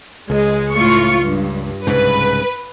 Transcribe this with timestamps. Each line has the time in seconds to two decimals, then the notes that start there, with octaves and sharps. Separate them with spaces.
0.30 C#2 G#3
0.75 A2 F4 C#6
1.23 G2
1.87 C2 G#2 C#3 B4